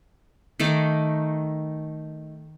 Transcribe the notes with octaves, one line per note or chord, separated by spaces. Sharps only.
D#3 A3 D#4 D6